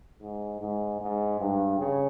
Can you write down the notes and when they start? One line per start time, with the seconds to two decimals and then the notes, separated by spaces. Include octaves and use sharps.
0.22 G#2
0.61 G#2
1.01 G#2
1.40 G2
1.79 C#3